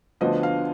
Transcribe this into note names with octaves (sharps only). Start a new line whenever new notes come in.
D2 D3 F3 B3 D4 D#5
F5